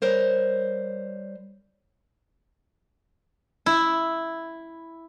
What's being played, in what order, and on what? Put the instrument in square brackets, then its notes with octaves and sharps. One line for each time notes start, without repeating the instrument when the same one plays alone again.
[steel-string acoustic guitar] G3 A#4 C5 C#5
[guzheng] E4